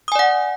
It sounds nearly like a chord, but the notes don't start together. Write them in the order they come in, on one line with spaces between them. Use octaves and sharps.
D#6 G#5 D5 F#5